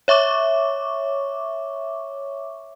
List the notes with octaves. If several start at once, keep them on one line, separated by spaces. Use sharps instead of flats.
C#5 E5 C#6 D6